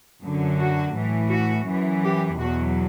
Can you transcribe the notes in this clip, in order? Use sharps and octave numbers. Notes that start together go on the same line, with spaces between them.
F#2 D3 F#3
F#4
A2 E3
F#4
F#2 E3
G4
E2 B2 F#3 F#4